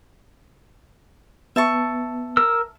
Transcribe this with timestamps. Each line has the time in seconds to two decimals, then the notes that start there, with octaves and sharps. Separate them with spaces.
1.56 B3 E5 A5 C#6
2.37 A#4 E6